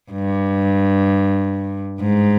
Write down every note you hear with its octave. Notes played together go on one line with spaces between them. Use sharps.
G2
G#2